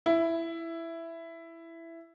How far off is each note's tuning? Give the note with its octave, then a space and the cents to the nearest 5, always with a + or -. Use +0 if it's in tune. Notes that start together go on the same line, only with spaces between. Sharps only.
E4 +10